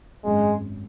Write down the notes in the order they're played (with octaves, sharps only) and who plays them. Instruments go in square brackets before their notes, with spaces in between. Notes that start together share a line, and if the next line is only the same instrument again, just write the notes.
[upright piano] G#1 F#2 F#3 C#4 [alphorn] G#3